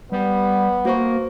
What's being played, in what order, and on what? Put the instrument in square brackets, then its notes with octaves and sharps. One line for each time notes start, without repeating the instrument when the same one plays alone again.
[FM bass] G3 [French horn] B3
[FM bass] A#3 [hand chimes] F#4 C5 C#6